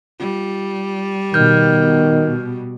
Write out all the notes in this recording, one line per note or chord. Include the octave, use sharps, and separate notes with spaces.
G3 F4
B2 D#3 F6 G6